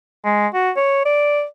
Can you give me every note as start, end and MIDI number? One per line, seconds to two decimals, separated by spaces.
0.25 0.47 56
0.54 0.71 66
0.76 1.01 73
1.05 1.44 74